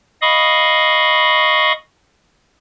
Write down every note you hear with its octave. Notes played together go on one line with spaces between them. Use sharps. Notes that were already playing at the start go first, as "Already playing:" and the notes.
D#5 F5 B5 C#6 D#6